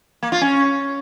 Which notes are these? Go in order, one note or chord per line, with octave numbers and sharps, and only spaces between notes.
A#3
F4
C#4